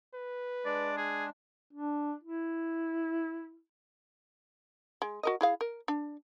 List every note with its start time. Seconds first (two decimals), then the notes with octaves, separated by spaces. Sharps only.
0.14 B4
0.65 G#3 D4 D5
0.97 G#4
1.73 D4
2.24 E4
5.02 G#3
5.23 F#4 A#4 D#5
5.41 E4 G#4 F5
5.61 A#4
5.88 D4